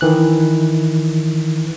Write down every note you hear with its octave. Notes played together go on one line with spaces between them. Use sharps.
D#3 E3 F#6